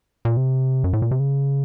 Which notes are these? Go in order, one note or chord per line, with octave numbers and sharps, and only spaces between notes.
A#2
C3
F#2
A2
A#2
C3
C#3